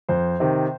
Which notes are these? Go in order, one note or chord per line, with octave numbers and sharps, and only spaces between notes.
F2 C5
C3 D#3